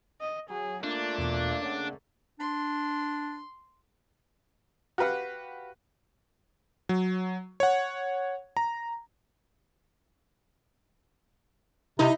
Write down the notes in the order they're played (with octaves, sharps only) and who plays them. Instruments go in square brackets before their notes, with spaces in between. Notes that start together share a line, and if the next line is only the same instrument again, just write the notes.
[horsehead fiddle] D#5
[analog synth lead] F#3 [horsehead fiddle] G#4
[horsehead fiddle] A3 A#3 [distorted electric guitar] D4 [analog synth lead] F4
[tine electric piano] E2 B2 D6
[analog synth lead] C#3 [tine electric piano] D5 F#5
[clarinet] D4 [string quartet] C6
[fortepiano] F#4 G4 B4 F5 F#5
[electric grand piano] F#3
C#5 F#5
A#5
[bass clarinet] C3 [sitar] D#4 [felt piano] E4